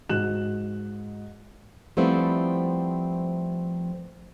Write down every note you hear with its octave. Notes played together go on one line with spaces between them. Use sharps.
G#2 F#4 F#6 E7
F3 G3 A3 B3 C4 E4